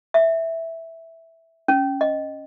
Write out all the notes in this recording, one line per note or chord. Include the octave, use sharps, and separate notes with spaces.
E5
C#4
D#5